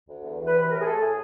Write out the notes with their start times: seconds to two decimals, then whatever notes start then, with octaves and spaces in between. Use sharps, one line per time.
0.09 D2
0.24 E2
0.39 E3
0.47 B4
0.55 C3
0.61 B4
0.70 A2 A#4
0.81 G#4
0.85 A3 A4
1.01 A2 G#4